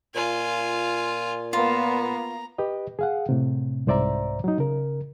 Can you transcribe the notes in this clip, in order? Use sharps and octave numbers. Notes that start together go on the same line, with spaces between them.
A#2 F4 G#5
A#3 B3 F4 A#5
G4 B4 D#5
G#4 F5 F#5
A2 C3
C2 G#2 C5 D5 E5 A#5
F#3 D#4
C#3 A#4